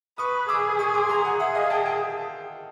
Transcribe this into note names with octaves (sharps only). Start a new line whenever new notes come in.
B4 C#6 D#6
G#4 D6 E6
C#6 D#6
C6 D6
A#5 C6
F#5 G#5
G#4 E5 F#5
D#5 F5
G5 A5
G5 A5